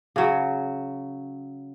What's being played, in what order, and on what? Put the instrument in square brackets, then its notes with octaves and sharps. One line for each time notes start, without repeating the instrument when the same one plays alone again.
[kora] C#3 F#3